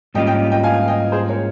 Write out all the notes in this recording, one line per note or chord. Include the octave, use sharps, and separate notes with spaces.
G#2 G3 A#3 C#4 F4 D#5 G5
D#5 G5
D#5 G5
F5 G#5
D#5 G5
G#4 C5
A#4 C#5